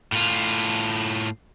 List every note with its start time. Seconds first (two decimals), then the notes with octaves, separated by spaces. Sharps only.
0.12 A2 F4